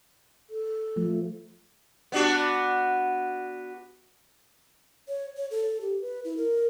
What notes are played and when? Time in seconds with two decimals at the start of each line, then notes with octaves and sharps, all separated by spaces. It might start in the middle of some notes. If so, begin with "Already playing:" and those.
0.50 A4
0.96 F3 A3
2.12 B3 D4 F#4
5.08 C#5
5.37 C#5
5.51 A4
5.81 G4
6.01 B4
6.25 E4
6.37 A#4